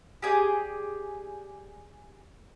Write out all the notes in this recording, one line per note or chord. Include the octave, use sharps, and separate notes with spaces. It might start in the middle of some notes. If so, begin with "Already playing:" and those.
G4 G#4 D5